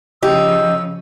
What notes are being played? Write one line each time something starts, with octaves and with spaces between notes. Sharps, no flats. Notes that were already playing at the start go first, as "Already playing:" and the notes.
C#3 F3 D#4 G4 E6